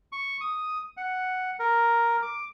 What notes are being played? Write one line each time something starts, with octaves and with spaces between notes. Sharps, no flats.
C#6
D#6
F#5
A#4
D6